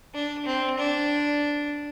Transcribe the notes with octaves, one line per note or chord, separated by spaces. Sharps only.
D4
C4
D4